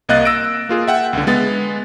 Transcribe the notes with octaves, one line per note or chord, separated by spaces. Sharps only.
C2 A#3 D#5 F5 F#6 A6
E6 A#6 D7
A#3 F4 G#4
E5 F#5 G5
C#2 D3
G#3 B3 A6